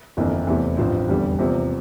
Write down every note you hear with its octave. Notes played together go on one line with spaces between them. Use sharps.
G1 F2 E3 A#3 D4
E2 C3 E3 A3
A1 G2 F3 C4
F1 E2 D3 G3
E2 C3 F3 A#3